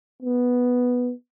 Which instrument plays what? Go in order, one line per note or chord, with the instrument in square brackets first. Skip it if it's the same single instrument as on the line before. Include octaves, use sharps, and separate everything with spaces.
[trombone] B3